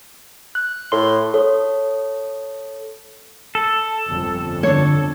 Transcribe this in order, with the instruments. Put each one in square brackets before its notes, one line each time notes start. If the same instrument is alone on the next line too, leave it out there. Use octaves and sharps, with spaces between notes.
[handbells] F#6
[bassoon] A2 [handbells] C6
[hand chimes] A4 C#5 D#6
[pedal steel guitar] A4
[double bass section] G1 F2
[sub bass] D3 [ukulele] D4 C#5